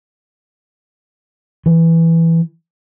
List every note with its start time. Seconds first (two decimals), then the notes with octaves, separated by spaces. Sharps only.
1.66 E3